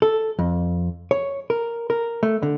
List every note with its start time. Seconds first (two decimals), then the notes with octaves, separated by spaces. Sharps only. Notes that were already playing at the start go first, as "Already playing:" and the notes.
0.02 A4
0.39 F2
1.11 C#5
1.50 A#4
1.90 A#4
2.23 A3
2.42 D3